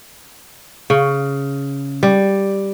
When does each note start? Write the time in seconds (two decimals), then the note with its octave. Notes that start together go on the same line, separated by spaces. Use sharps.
0.90 C#3
2.03 G3